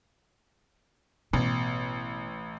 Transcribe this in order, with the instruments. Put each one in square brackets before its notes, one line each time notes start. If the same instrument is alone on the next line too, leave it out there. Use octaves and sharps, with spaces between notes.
[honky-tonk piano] A1 [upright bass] B2